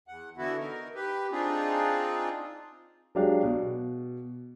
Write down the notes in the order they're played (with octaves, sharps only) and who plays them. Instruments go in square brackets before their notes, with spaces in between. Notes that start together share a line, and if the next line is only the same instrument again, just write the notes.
[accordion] E2 F#5
D3 E3 B3 E4 F#4
D#4 A#4
G4 B4
C4 D4 D#4 F4 G#4
[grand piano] F#3 G#3 D4 G4 F5
B2